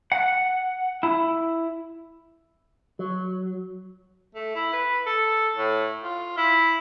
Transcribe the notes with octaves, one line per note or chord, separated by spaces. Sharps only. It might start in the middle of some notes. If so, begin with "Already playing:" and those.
F#5
E4
F#3
A3
E4
B4
A4
A2
F4
E4